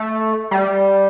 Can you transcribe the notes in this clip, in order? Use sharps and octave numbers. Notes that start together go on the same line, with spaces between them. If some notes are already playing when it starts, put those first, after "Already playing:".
Already playing: A3
G3